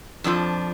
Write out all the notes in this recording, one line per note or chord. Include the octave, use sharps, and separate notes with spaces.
F2 D3 F3 D4